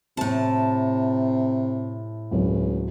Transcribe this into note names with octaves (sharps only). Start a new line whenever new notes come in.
A2 C3 A5
D1 C#2